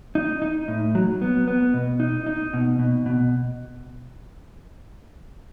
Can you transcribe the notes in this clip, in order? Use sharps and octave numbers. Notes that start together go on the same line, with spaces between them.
D#4
D#4
A2
F#3
B3
B3
B2
D#4
D#4
B2
B2
B2